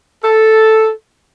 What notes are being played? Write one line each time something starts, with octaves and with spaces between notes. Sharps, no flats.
A4